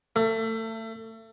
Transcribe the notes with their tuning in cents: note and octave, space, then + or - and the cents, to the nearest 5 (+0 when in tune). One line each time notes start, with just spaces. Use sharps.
A3 +30